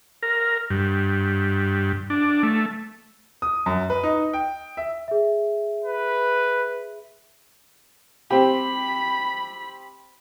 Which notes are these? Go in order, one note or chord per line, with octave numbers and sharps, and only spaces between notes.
A#4
G2
D4
A3
D#6
F#2
B4
D#4
G5
E5
G#4 E5
B4
C4 G4 B5